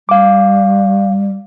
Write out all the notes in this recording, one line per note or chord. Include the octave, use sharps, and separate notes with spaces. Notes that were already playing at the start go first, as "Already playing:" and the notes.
G3 F5 D6